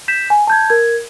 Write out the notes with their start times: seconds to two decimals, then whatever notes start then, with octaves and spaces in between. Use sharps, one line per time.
0.08 G6 B6 E7
0.30 G#5
0.47 A5 G6 G#6
0.70 A#4 G#6